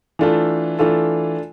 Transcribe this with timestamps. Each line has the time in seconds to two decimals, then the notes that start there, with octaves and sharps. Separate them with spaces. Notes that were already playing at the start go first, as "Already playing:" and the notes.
0.19 E3 A3 D4 F4 A4
0.79 E3 A3 D4 F4 A4